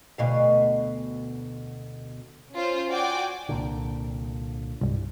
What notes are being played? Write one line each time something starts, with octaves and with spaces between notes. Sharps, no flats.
D2 B2 F5
C#4 F4 C5
F#4 D5 G5 G#5 D6
C2 A#2 D3
C2 G2